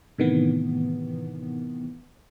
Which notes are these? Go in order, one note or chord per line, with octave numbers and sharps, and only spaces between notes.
A2 C3 D#3 E3 B3